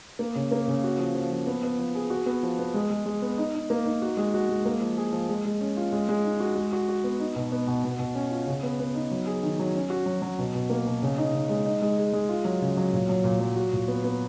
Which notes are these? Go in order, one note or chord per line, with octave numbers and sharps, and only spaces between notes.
A#3
C#3
A#3
C#3
F#4
F3
F3
F3
B3
B3
F3
G#4
F#4
B3
F3
B3
G#3
G#3
G#3
B3
D#4
D#4
A#3
D#4
F#4
G#3
F#4
G#3
A#3
F3
G#4
F3
G#3
G#3
C#4
F4
G#3
G#3
D#4
F#4
G#3
F#4
F#4
B3
D#4
B2
B3
B2
B2
B2
C#4
F4
C#3
B3
B3
D#4
F#3
G#4
D#3
F#3
C#4
F#4
F#3
F#3
B2
B2
A#3
B2
C#3
D#4
C#3
G#3
D#4
G#3
G#4
G#3
F4
F#3
C#3
F#3
A#2
F#3
A#2
F#3
F#4
A#2
B3
B3